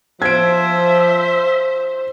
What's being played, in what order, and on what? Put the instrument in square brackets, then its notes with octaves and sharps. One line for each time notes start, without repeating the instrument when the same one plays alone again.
[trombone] F3 [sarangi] C5 [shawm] E5 [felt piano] G#6 D7